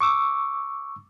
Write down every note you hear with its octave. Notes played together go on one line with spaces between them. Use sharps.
C#6 D6 E6